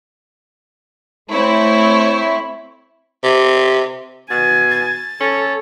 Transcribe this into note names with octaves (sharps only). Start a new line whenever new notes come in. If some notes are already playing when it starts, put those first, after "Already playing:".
A3 C4 E4 C#5
C3
B2 G#5 A6
A6
C#4 A4